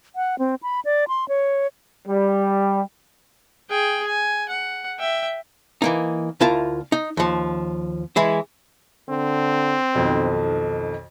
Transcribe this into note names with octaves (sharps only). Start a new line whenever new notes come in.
F#5
C4
B5
D5
C6
C#5
G3
G#4 G5
G#5
F#5
E5 G5
E3 A#3 D#4
D2 E4 F4 A#4 A5
D#4
D#2 F3
E3 G#3 E4
D3 C4
B1 F2 D#3 A4